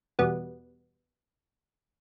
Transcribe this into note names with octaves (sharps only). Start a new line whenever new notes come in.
E2 B2 G3 B3